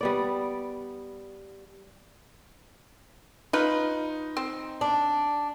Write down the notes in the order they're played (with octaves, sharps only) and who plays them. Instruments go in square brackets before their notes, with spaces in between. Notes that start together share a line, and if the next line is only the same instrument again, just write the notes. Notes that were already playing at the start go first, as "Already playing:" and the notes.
[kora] G3 B3 D5
[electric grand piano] D#4 [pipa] F4 B4
[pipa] C4
[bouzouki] D4